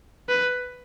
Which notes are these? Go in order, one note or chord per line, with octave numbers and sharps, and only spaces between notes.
B4